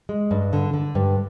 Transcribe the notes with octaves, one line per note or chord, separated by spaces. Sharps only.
G#3
G2
D3
D3
G2